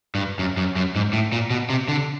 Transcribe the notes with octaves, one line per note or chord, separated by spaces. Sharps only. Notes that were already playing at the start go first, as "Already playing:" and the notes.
G2
F#2
F#2
F#2
G#2
A2
A#2
B2
C3
D3